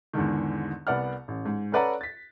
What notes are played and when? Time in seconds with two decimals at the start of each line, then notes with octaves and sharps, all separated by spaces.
0.13 E2 G#2 D3 D#3
0.87 C2 B3 D5 F#5 F6
1.28 A1
1.45 G#2
1.72 C#4 A4 B4 D5 F#5 A#5
2.01 A6 B6